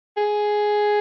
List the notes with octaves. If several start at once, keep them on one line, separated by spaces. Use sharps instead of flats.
G#4